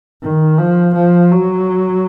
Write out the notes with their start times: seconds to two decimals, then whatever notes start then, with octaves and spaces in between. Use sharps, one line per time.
0.22 D#3
0.58 F3
0.95 F3
1.31 F#3